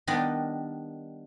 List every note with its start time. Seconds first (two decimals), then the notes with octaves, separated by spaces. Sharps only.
0.07 D#3 G3 B3 D4 A#4 D#5